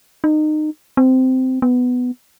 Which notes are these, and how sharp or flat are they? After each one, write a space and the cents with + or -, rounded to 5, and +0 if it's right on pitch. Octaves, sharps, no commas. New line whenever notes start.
D#4 -25
C4 -15
B3 +10